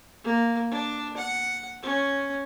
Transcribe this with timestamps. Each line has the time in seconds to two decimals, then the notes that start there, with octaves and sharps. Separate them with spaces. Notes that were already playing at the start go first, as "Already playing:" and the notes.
0.24 A#3
0.71 D4
1.17 F#5
1.82 C#4